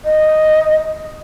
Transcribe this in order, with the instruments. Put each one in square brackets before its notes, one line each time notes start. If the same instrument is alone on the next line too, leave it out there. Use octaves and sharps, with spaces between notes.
[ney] D#5